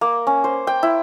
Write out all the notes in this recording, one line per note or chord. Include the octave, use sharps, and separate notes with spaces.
A#3
C#4
C5
G5
E4